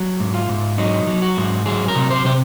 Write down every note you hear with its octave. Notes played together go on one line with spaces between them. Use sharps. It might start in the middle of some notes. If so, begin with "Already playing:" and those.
Already playing: F#3
G#2
F4
G#2
F#3 D#4
F#3
F#4
G#2
F#3 G#4
A#4
C3
C5
C3 C5